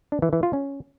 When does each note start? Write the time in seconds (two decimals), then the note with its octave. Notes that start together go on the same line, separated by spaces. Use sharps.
0.12 D4
0.22 E3
0.33 E3
0.43 F4
0.53 C#4